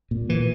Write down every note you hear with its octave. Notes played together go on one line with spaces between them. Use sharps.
A#2
A#2 E3